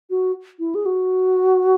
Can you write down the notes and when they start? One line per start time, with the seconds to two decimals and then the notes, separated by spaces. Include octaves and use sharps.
0.10 F#4
0.59 E4
0.75 G#4
0.86 F#4